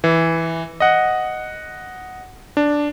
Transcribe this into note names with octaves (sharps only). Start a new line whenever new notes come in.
E3
D#5 F#5
D4